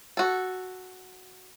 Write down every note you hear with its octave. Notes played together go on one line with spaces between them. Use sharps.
F#4 A4